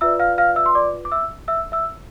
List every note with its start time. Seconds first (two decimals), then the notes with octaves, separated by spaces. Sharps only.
0.01 F4 B4 D5 E5 E6
0.19 F5 F6
0.38 F5 F6
0.56 E5 E6
0.66 C6
0.75 D5 D6
1.05 D6
1.12 E5 E6
1.48 E5 E6
1.72 E5 E6